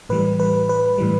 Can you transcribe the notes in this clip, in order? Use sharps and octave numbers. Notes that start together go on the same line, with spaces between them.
A2 E3 G3 B4
B4
B4
A2 E3 G3